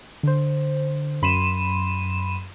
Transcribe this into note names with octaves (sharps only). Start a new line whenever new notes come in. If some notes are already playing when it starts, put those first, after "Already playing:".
D3 C5
F#2 B5 C6 D#7 E7